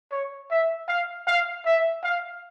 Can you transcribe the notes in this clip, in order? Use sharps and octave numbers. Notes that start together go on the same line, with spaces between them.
C#5
E5
F5
F5
E5
F5